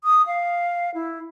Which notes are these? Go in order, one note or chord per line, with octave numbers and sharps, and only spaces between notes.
D#6
F5
E4